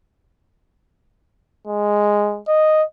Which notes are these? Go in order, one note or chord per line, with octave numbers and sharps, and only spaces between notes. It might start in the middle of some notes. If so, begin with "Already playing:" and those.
G#3
D#5